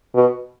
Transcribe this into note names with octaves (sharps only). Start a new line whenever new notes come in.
B2